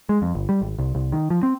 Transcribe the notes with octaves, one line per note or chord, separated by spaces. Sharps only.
G#3
F2
G1
G3
G#1
C2
C2
D#3
F3
C4